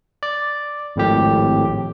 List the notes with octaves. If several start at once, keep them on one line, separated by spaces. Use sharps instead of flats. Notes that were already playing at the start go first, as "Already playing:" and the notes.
D5
G#1 F2 A2 G4